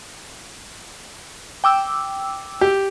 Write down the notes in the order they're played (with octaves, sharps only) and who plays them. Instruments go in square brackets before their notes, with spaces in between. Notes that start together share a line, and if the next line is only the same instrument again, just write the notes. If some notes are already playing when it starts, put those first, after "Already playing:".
[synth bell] G5 D6 E6
[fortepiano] G4